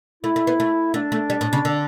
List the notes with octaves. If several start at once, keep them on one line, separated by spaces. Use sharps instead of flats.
A3 E4
A3
B3
A3
A3 D4
A3
G3
A2
C#3
D3